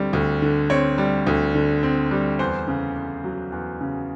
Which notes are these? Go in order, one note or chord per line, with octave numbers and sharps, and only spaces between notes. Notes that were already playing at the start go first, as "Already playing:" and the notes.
Already playing: D2 D3 G3 C4
D2
D3
C4 C#5
G3
D2
D3
C4
G3
E2 C5
C#3
E2
F#3
E2
C#3